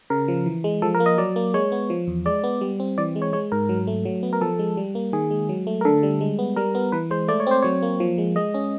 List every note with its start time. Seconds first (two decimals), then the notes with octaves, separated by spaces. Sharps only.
0.10 C#3 A#4
0.28 F3
0.46 E3
0.64 G#3
0.82 F3 A4
0.95 A#4
1.00 A#3
1.06 D#5
1.18 F#3 D5
1.36 A#3
1.54 G#3 C#5
1.72 B3
1.90 F3
2.08 E2
2.26 G#3 D5
2.44 B3
2.61 G3
2.80 C4
2.98 E3 D5
3.16 G#3
3.22 C#5
3.33 G#3 C#5
3.52 G#2 A#4
3.69 F#3
3.87 A3
4.05 F#3
4.23 B3
4.33 A#4
4.41 F3 A4
4.59 G#3
4.77 G3
4.95 A#3
5.13 D#3 G#4
5.31 G#3
5.49 F#3
5.67 A3
5.81 A#4
5.85 D3 A4
6.03 G3
6.21 G#3
6.39 B3
6.56 G3 A#4
6.75 B3
6.92 E3 B4
7.11 G#3 C5
7.28 A3 D5
7.40 C#5
7.47 C4 C5
7.62 F#3 C#5
7.82 A#3
8.00 F3
8.18 G#3
8.36 G#3 D#5
8.54 C#4